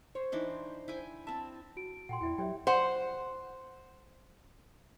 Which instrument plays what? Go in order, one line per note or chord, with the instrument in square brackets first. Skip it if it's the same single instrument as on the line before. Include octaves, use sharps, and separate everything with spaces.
[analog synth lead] C5 [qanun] C#5
[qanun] E3 D4 D#4
E4 G5 G#5
[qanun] C4 E5 [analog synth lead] A5
[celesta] F#4 D7
[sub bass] A#2 [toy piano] F#5 G5 C6
[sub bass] E2 [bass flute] E4 [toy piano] D5 E5 G5
[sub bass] F#3 [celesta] G4 E5 [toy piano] C#5 D5 G5
[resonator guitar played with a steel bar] C5 F#5